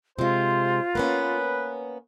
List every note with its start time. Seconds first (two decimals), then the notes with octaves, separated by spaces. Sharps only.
0.19 C3 G#3 F4 C5
0.95 A#3 B3 C#4 B4